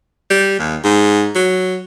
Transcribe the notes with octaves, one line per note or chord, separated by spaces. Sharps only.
G3
D#2
G#2
F#3